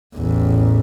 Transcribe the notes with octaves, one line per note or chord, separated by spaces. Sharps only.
A1 E2